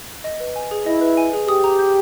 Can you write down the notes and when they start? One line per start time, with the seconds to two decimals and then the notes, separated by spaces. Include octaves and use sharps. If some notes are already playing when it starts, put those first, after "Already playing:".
0.24 D#5
0.40 B4
0.56 G#5
0.71 G#4
0.86 E4 D#5
1.01 B4
1.17 G#5
1.33 G#4
1.48 G4 D#6
1.64 A#5
1.79 G6